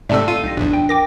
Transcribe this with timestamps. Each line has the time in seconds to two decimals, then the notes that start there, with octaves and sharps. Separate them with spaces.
0.09 G#2 C3 A3 A4 D5 E5 A5 E6
0.28 F4 D#7
0.43 B1 D#4 G4 A#6
0.57 A1 E2 D4
0.73 G5
0.89 A#4 G5 D6 A#6